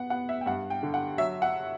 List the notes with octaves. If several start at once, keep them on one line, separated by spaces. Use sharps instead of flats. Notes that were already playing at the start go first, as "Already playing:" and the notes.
Already playing: B3 F#5
B3 F#5
E5
G5
G2 F#5
G5
D3
F#5
F#3 E5
F#5